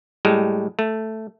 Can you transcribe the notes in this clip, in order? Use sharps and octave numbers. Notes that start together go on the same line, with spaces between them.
A2 G3 G#3
A3